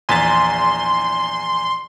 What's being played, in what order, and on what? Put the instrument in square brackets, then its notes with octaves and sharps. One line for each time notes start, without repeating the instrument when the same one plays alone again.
[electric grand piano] A#1 E2 B6 [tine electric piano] G#5 A#5 A6 [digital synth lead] C6